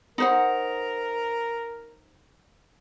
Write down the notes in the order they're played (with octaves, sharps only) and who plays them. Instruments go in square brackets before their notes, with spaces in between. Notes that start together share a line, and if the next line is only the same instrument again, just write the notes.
[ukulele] D#4 C5 F#5 [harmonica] A#4